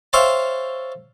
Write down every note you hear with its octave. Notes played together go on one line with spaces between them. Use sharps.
C5 C#5 E5 F5 G5 A5